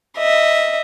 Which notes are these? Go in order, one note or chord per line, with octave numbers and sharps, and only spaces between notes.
D#5 E5